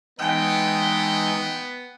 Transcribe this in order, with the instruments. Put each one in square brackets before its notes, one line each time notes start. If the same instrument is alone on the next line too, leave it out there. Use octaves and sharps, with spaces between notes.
[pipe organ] E3 G#3 D#4 [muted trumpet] B3 [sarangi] G5